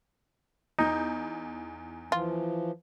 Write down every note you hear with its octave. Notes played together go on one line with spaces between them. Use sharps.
E2 D#4 G6
E3 F3 F4